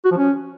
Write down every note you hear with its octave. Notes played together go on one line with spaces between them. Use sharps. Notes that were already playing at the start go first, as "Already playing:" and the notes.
F#4
F3
C#4